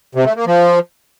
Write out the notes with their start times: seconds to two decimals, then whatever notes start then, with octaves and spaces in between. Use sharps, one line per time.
0.15 C3
0.25 A3
0.36 A#3
0.46 F3